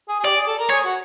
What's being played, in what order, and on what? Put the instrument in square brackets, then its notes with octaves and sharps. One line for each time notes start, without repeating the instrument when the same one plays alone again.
[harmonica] G#4
G#4
[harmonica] G4 [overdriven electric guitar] D5
[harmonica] G#4
A4
A#4
[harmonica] G#4 [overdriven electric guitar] C#5
[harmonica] F#4